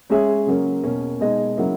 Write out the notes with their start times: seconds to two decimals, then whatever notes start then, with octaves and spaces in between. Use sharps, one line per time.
0.10 G#3 C#4 G#4 C#5 E5
0.46 C#3 F#3 A#3 C#4
0.83 E2 B2 A#3 C#4
1.20 B2 G#3 D#4 G#4 D#5
1.57 C#3 F#3 A#3 E4